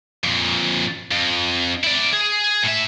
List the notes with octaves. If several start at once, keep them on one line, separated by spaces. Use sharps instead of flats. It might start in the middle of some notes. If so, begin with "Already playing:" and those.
F2 A#2
F2
E4 D5
G#4
A2 E5